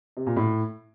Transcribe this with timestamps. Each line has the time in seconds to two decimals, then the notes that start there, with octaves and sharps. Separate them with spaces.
0.17 C3
0.27 A#2
0.37 A2